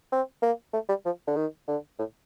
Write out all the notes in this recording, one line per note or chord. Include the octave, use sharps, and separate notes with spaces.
C4
A#3
A3
G3
F3
D3
D#3
D3
A2